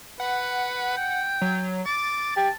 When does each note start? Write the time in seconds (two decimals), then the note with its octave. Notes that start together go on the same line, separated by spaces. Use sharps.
0.20 B4 F#5
0.97 G5
1.41 F#3
1.86 D6 A6
2.36 G4 A5